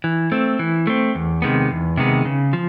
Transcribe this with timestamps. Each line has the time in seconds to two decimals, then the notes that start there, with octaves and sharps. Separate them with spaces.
0.04 E3
0.32 A3 C4
0.59 E3
0.87 A3 C4
1.15 E2
1.42 C3 D#3 G#3 B3
1.71 E2
1.97 C3 D#3 G#3 B3
2.25 C#3
2.53 F3